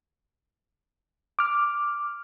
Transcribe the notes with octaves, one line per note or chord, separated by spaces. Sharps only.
D6 F6